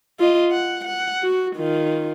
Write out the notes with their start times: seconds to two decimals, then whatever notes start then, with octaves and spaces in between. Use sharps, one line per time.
0.20 F4 D#5
0.52 F#5
0.85 F#5
1.22 F#4
1.56 D#3 F4